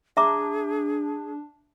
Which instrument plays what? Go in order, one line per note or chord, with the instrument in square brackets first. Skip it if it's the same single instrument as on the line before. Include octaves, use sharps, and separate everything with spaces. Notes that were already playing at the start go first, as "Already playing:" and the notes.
[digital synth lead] D4 [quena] G#4 [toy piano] E5 A#5 D6